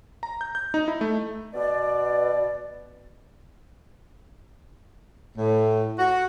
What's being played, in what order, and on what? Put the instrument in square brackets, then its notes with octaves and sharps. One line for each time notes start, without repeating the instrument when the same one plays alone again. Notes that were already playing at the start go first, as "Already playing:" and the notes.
[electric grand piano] A#5
G6
G6
D#4
E4
A3
[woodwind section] B2 D5
[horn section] A2
F#4